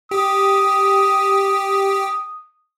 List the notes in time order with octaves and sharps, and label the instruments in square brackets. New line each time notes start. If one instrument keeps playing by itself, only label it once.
[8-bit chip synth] G4 [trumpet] D#6